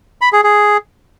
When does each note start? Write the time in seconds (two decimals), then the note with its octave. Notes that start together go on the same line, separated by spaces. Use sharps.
0.21 B5
0.33 G#4
0.44 G#4